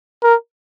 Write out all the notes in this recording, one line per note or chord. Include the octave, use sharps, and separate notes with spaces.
A#4